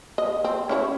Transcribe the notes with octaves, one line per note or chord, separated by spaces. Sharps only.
D#5
C4
C#4 E4 C#5